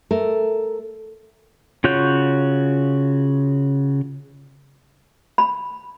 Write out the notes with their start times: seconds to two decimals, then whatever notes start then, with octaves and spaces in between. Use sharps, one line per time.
0.11 A3 A#4
1.84 C#3 F4 F#4 C#5 G6
5.38 B5